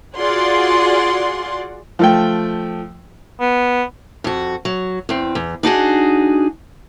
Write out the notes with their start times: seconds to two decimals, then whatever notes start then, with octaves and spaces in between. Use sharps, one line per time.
0.18 F4 F#4 G#4 D5 F#5 C6
1.99 F3 A3 G5
3.41 B3
4.24 F2 F#4
4.65 F#3
5.09 E2 C4
5.35 E2
5.63 D4 D#4 F#4 G#4